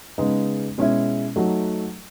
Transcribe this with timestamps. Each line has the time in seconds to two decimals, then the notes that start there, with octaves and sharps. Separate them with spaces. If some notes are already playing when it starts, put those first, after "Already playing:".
0.18 C#3 G#3 B3 D#4
0.78 B2 G#3 C#4 E4
1.36 F#3 A3 D#4